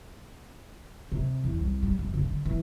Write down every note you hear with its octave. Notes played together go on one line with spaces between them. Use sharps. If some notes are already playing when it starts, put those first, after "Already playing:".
C3
E2
C2
G3
F#2
C#3
D3
E3